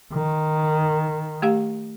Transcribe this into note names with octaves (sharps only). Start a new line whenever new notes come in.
D#3
A3 G4 F5